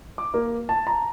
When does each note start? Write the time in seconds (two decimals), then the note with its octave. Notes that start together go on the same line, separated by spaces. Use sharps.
0.18 D6
0.34 A#3
0.69 A5
0.87 A#5